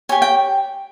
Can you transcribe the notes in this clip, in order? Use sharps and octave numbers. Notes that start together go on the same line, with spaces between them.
G4 C#5 G#5
G5